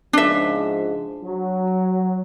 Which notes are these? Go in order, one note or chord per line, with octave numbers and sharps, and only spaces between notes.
G#2 C#3 F3 D4 E5
F#3